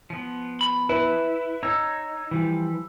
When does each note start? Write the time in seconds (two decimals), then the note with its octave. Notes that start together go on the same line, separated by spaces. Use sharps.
0.10 F3 B3
0.61 B5
0.89 E4 B4
1.63 D#4 C#5 A#5 E6
2.31 E3 F3 G3